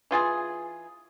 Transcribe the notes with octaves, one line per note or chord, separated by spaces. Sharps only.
E3 F4 G#4